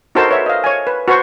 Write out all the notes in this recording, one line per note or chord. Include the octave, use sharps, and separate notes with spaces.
D#4 F#4 A4 A#4 C5 A5
B4 C#5 E5
D#5 F5
C#5 G#5
B4
F#4 B4 C5 C#6